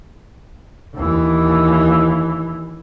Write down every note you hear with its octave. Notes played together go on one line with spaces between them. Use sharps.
D#2 E3